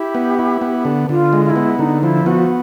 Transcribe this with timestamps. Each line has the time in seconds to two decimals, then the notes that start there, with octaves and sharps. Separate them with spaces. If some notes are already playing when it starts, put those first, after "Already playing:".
Already playing: E4 G4
0.15 B3
0.39 E4
0.62 B3
0.85 D3
1.09 D3 F4
1.33 G#3
1.45 F4
1.49 E4
1.56 B3
1.79 D3 D#4
2.03 F3 E4
2.26 B3 F#4